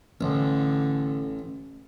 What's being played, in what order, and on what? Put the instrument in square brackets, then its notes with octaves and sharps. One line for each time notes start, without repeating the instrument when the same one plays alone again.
[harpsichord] A1 [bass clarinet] D3